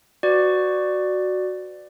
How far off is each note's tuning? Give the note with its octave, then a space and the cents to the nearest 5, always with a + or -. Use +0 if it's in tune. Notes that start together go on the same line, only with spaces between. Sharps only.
F#4 +0 B4 +40 D5 +10